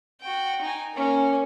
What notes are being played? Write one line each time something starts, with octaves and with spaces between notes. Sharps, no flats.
F#4 G5
D#4 G#5
A#3 C#4